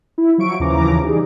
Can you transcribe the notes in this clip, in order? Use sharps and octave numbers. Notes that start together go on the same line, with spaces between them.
E4
F3 F#3 E4 C#6 D7
D#2 C#3 E3 F3 A#5 D6
G3 D#4 G#4